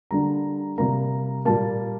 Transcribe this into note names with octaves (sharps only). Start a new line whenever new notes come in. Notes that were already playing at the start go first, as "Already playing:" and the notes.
D3 G3 A#3 A#5
C3 G3 A#3 A#5
A#2 G3 A#3 A5